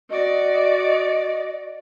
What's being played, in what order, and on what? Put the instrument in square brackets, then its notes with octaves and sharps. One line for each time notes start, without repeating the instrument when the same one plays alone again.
[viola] F#4 D5 [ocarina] D#5